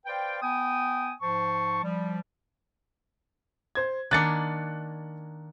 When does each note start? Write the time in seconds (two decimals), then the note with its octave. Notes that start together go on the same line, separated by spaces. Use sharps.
0.06 B4 C5 D5 F5 G5
0.41 B3 G5 G#5 D#6
1.21 G#2 F3 C5 A5 C#6
1.83 F3 G3
3.75 C5 G#6
4.11 D#3 A#3 D4 F#6 A6 C#7